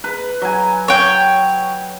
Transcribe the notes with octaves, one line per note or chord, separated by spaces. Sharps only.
B4
F#3 G#5
C#5 G5